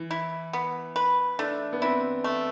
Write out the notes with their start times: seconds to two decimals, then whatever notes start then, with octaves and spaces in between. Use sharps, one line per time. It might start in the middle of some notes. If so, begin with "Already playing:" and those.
Already playing: E3
0.11 E4
0.53 B3
0.96 B4
1.39 A3 D4
1.73 B3
1.82 C4 E4
2.24 A3